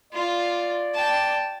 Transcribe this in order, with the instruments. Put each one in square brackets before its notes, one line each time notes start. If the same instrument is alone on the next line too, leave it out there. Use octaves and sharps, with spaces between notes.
[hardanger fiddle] F4 [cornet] D5
[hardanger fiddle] G5 A5